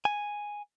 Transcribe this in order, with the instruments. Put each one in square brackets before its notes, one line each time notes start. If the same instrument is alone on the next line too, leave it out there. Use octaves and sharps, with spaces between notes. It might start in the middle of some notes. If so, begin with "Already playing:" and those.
[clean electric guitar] G#5